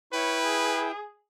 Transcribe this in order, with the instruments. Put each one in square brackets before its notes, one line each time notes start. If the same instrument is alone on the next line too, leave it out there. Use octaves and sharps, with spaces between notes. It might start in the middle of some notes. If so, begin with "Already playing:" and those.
[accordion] E4 G5 [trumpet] B4 [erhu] C#5
[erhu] G#4